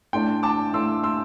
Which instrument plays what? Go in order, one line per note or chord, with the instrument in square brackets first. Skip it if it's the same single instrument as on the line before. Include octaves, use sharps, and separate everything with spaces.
[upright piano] A2 A3 D4 [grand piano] G5 C6
[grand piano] A5 D6
[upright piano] A2 A3 D4 [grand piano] C6 E6
[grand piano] C6 E6